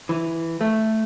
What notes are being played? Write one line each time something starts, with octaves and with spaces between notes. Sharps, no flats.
E3
A3